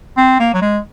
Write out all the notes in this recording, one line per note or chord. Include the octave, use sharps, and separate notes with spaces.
C4
A#3
F#3
G#3